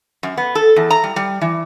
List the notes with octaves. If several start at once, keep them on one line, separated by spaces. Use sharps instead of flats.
F#2
B3
A4
E2
A#5
G3
G3
E3